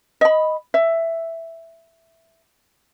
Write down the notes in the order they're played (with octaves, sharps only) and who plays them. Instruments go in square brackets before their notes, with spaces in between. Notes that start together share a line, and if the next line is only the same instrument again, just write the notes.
[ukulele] D#5 B5
E5